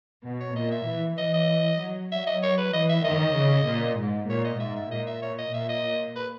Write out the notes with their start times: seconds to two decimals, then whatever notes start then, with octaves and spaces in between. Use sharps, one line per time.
0.25 B2
0.41 C#5
0.56 A#2 D#5
0.71 E5
0.87 E3
1.18 E3 D#5
1.34 D#5
1.80 F#3
2.12 F#3 E5
2.27 D#5
2.43 C#5
2.58 B4
2.74 E3 D#5
2.90 E5
3.05 D#3 D#5
3.36 C#3
3.67 A#2
3.98 G#2
4.29 A#2 C#5
4.45 D#5
4.60 G#2 E5
4.76 E5
4.91 A#2 D#5
5.07 E5
5.22 C#5
5.39 D#5
5.54 A#2 E5
5.69 D#5
6.16 B4